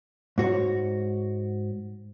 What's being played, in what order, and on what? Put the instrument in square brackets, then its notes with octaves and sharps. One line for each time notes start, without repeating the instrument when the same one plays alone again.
[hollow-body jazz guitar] G#2 F#4 C#5